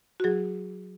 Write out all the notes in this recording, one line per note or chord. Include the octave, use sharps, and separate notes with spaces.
F#4
F#3 G#4